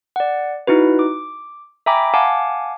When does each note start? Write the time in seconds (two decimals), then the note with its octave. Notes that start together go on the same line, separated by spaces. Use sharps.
0.16 D5 F#5
0.67 D#4 E4 F#4 B4
0.99 D6
1.86 E5 G5 G#5 A#5 B5 D6
2.14 F5 F#5 G#5 A5 D6